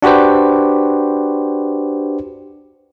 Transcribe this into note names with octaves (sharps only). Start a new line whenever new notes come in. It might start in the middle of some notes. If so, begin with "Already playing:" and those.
D4 F#4 G4 B4 C5